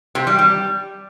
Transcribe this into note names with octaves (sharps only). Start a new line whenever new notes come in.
C3
G3
G3